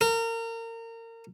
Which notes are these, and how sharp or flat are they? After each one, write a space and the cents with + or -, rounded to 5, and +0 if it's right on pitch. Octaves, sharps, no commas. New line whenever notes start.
A#4 -30